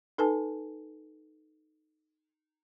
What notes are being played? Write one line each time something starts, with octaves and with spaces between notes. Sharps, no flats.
D#4 A4 B4 G#5 A5